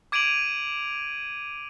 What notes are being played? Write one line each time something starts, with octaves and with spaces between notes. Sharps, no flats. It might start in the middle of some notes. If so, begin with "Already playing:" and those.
D6 G#6 D7 D#7 F7 F#7